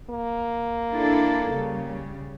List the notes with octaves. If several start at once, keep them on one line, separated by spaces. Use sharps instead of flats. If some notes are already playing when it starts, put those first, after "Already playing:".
A#3
D4 E4 A4
C#3 G3